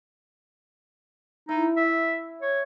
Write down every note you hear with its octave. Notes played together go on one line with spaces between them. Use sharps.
D#4 E4
E5
C#5